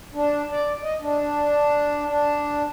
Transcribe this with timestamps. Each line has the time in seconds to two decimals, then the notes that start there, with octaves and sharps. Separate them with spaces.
0.14 D4
0.51 D5
0.83 D#5
1.01 D4
2.05 D4